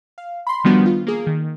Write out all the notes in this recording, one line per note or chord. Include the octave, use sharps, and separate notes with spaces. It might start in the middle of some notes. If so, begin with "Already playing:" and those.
F5
B5 C6
D#3 F3 G3 B3 D4 F#4
F4
A#3 G#4
D#3